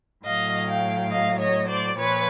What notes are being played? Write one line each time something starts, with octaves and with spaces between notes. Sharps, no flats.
A2 F#3 D#5 F5
F5 G5
D#5 F5
C#5 D#5
C5 D5
A#2 F3 B4 C#5